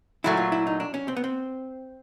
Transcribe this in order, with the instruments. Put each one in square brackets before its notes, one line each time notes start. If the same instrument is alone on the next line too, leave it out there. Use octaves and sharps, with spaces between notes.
[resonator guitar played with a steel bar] A#2 F#3 A3 [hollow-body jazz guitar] E4
[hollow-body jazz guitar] F4
E4
D#4
D4
C#4
C4
B3
C4